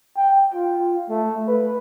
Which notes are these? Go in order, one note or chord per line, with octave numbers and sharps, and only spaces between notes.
G5
F4
A3
B4